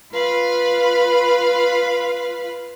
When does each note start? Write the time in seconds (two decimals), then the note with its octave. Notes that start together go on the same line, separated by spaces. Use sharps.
0.13 F4 B4 F5 B5